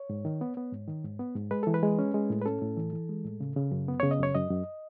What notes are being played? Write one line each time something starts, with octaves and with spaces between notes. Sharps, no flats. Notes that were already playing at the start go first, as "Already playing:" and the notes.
Already playing: C#5
G#2
D#3
B3
B3
G#2
D#3
G#2
B3
G#2
G#3 B4
E3 A4
B4
G#3
C#4
G#3
A2
B4
C#4 A4
A2
E3
E3
G#3
A2
C#3
C#3
F#2
B3
C#3 C#5
D#5
F#2 C#5
F#2 D#5
F#2